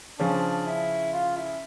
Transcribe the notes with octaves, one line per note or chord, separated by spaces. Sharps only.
C#3 F3 C#4 D4
E4
F4
E4